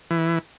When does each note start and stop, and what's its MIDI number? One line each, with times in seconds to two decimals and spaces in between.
0.11 0.39 52